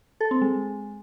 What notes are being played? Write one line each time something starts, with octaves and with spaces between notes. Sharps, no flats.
A4
C4
G#3